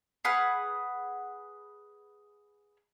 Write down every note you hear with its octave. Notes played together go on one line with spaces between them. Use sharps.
G#4 B4 F#5 F6